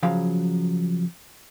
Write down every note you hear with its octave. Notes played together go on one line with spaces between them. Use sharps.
C#3 F3 F#3 F5